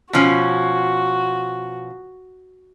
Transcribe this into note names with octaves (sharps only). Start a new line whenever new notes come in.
B2 F3 C#4 F#4